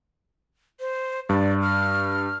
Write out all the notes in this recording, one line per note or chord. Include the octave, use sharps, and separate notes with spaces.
C5
G2 D5
F6